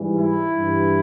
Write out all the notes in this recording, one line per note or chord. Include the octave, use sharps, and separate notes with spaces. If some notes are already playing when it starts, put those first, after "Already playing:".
Already playing: G#2 E3 G3
E4
G2 E3 G3